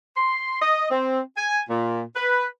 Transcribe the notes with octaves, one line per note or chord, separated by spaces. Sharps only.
C6
D#5
C4
G#5
A#2
B4